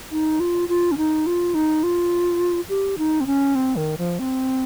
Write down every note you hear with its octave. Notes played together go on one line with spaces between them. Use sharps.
D#4
F4
F4
C#4
D#4
F4
D#4
F4
G4
D#4
C4
C#4
C4
D#3
F3
C4